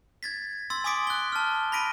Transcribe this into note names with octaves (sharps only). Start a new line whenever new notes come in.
G#6 A6 B6
C6 E6 A6
G#5 C6 D6 D#6 B6 D7
F#6 G7
A5 F6
B5 A#6 B6 D7 D#7